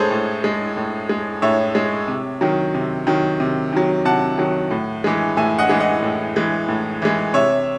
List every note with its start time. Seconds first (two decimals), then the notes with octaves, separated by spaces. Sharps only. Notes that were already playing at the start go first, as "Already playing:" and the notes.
Already playing: A2 G#3 G#4 A4 C5 C#5
0.11 A2
0.44 G#3
0.77 A2
1.09 G#3
1.42 A2 C#5 E5
1.75 G#3
2.08 C3
2.41 D#3 F#3
2.74 C3
3.07 D#3 F#3
3.40 C3
3.73 D#3 F#3
4.05 C3 F#5 A5
4.38 D#3 F#3
4.71 A2
5.04 E3 G#3
5.37 A2 E5 G#5
5.59 D#5 F#5
5.69 E3 G#3
5.80 D#5 F#5
6.02 A2
6.36 E3 G#3
6.68 A2
7.02 E3 G#3
7.34 C3 C#5 E5